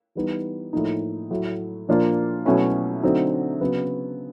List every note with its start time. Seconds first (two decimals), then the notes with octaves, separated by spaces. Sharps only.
0.15 E3 G3 B3 D#4
0.73 A2 F3 A#3 D#4
1.31 A2 F#3 A3
1.89 A#2 F3 A#3 D4 F4
2.45 B2 F#3 A3 C#4 E4
3.03 D3 F#3 A3 C4 D#4
3.61 C#3 F#3 B3